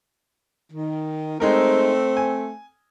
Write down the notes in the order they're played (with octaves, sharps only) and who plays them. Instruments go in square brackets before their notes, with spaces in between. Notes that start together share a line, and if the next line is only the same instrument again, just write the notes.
[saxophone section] D#3
[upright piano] G#3 D#4 A#4 [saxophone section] A3 C4
[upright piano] G#5